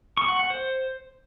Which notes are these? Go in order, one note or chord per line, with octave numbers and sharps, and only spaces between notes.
C#6
F#5
F#5
C5